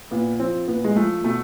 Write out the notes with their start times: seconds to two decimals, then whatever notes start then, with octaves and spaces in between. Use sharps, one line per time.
0.11 A#2 B3
0.39 F3 C4
0.68 A#2 B3
0.84 G#3
0.96 F3 A3
1.24 B2 A3